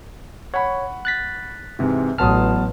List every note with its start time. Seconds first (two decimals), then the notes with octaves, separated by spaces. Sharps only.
0.54 C#5 F#5 B5 C#6
1.05 F#6 A6 B6
1.79 G#2 C3 E3
2.18 A1 F#3 B3 A5 C6 D#6 F6